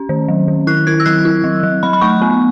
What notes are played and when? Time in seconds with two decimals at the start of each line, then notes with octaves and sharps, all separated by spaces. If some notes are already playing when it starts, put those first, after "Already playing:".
Already playing: C#4
0.09 D#3
0.28 F#3
0.48 D#3
0.67 E4 F#6
0.87 E4 G#6
1.00 E6
1.06 F#3 F#6
1.25 E4
1.44 F#3
1.63 F#3
1.83 F#3 B5
1.93 B5
2.01 A3 C#6
2.22 B3